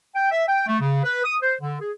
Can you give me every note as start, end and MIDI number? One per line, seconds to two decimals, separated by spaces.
0.15 0.29 79
0.31 0.44 76
0.48 0.66 79
0.67 0.77 57
0.80 1.03 49
1.04 1.22 71
1.24 1.36 87
1.42 1.55 72
1.60 1.79 50
1.81 1.91 68